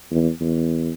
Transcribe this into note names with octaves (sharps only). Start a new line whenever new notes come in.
E2
E2